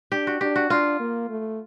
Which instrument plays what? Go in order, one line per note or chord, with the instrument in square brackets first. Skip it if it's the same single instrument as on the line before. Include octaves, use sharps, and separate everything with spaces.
[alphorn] D4 [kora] G4
[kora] F#4
[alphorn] D4 [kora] G4
[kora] F#4
[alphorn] D4 [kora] F4
[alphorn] A#3
A3